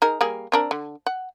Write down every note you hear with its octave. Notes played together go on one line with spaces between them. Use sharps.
D#4 G#4 A#4
G3 A#3 G#4
C4 D4 A#4
D3
F#5